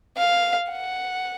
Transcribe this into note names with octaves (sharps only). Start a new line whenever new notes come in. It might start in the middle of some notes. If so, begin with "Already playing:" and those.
F5
F#5